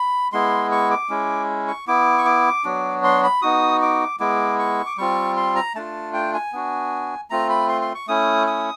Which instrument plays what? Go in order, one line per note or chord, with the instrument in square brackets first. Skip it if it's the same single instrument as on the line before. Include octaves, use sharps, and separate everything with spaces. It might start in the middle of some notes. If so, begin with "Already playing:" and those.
Already playing: [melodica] B5
G#3 B3 E4 C6
C#6
D6
G#3 C#4 E4
C#6
B3 E4 D6
C#6
D6
F#3 B3 D4 F#4
C6
B5
B3 D#4 F#4 D#6
D6
G#3 B3 E4 D6
C#6
D6
G3 C4 F4 C#6
C6
A#5
A3 D4 F4 A5
G5
G#5
B3 D4 F#4
A3 C4 F4 A#5
B5
C6
C6
C#6
A3 C#4 E4 D#6
D#6